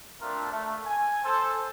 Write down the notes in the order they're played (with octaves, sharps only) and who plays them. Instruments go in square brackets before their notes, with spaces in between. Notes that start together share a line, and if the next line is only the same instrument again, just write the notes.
[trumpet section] A3 C4 D4 F4 A#4
A3
G#5
A4 C5